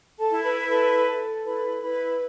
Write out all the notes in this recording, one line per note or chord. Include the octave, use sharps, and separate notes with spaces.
A4 A5
E4
B4 B5
A4 B4 B5
A4
E4 B4 B5
E4 B4 B5